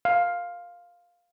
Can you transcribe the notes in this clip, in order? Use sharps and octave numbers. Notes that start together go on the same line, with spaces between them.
F5